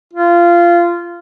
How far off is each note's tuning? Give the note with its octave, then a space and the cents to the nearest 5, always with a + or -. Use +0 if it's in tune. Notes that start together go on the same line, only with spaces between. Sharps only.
F4 -20